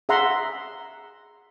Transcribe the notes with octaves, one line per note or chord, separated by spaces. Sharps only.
G#4 E5 F#5 A#5 C6